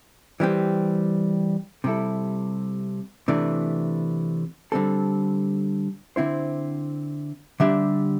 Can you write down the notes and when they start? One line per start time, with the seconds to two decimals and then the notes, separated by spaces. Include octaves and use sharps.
0.40 E3 G3 C4 G4
1.84 C3 G3 E4 A4
3.28 C3 E3 A3 D4
4.72 D3 G3 C4 A4
6.16 D3 C4 E4 C5
7.60 D3 G3 D4 G4 E5